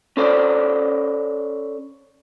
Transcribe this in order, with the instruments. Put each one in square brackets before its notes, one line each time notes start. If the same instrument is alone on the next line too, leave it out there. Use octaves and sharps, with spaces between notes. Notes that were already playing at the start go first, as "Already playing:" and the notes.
[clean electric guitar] C#4 A4 C5 D5